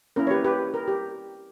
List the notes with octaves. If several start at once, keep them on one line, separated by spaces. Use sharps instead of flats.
A#3 C#4 E4 A#4
C#5
G4 B4
G4 B4
A#4
G4